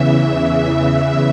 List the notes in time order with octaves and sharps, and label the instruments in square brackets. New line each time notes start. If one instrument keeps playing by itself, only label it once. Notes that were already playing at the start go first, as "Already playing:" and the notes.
Already playing: [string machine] E2 C#3 E3 E5